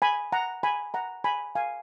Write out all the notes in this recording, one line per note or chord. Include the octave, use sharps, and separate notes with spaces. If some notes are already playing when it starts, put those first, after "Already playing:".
G#5 B5
F#5 A#5
G#5 B5
F#5 A#5
G#5 B5
F5 G#5